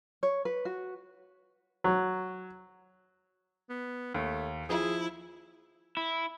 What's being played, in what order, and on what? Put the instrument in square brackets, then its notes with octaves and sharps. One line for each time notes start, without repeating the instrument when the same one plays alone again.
[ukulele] C#5
B4
F#4
[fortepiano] F#3
[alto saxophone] B3
[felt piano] D#2 [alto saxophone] A3
[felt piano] F3 [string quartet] E4 [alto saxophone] G#4
[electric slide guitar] E4